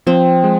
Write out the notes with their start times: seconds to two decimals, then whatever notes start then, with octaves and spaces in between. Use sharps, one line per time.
0.07 F3 C4
0.44 G#3